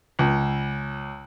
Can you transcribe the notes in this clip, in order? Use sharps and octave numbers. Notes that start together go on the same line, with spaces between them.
C#2